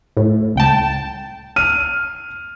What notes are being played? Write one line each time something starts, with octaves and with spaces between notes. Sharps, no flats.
A2
C#2 G5 A5
F6 D#7